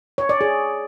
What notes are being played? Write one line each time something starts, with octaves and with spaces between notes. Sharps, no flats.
C#5
D5
G#4